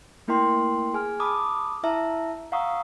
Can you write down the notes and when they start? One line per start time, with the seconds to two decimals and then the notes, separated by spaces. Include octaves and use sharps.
0.28 A3 A#3 E4 A#4 G5 C6
0.93 G#4 G#5 F6
1.20 A5 B5 D6 D#6
1.83 E4 E5 A5 A#5
2.52 F5 F#5 A#5 C#6 D#6 E6